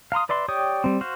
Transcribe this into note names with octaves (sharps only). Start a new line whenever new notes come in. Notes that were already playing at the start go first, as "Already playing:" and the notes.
F5 A#5 C6 D#6
B4 D5 E5 C6
G4 C#5 D5 G5 D#6
G3 C4
F#4 C5 F5